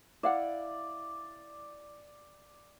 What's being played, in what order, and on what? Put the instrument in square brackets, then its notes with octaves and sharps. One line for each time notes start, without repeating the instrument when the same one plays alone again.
[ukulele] E4 F5 F#5 [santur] D5